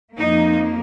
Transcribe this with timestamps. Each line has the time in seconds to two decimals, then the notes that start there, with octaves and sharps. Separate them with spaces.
0.16 F2 F3 A#3 D#4